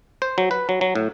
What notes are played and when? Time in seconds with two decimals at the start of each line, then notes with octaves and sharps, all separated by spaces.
0.22 C5
0.38 F#3
0.51 B4
0.69 F#3
0.81 F#3
0.95 A2